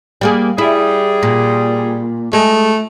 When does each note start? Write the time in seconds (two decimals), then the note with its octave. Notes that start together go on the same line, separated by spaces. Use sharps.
0.21 G3 A#3 G#4
0.58 G3 E4 G#4
1.23 A#2
2.33 G#3 A3